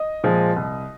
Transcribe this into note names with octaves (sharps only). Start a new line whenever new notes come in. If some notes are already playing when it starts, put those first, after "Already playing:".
Already playing: D#5
A#2 F3 G#3
C2